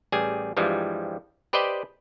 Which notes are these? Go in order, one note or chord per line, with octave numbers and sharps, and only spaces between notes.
A1 G3 G#4 G#5
G2 E3 F3 G3 G#3
G4 B4 C5 D5 D#5 G5